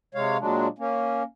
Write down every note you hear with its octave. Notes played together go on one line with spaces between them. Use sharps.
C3 G#3 C#5 F5
A#2 F#3 G#3 D4
A#3 C#4